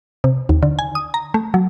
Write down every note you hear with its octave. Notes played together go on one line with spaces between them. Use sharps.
C3
D#2
D3
G#5
D#6
A#5
A3
F#3